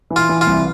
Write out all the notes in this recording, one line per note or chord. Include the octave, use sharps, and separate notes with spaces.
E3
F4
E3
F4
C2